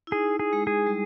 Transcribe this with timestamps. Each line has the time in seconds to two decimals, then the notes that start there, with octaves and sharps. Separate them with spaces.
0.07 E4
0.12 D#4 G#4
0.39 G#4
0.53 G#3
0.67 G#4
0.87 G3